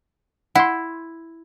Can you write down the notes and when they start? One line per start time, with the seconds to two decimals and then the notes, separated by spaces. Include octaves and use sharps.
0.55 E4 F#5 C6